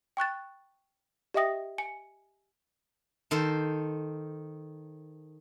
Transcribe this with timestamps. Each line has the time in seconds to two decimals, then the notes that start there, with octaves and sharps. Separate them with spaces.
0.17 G5 C#6 F#6 A6
1.34 G4 D#5 E5 G5 D#6 A#6
1.78 G#5 C#7
3.31 D#3 A4 C5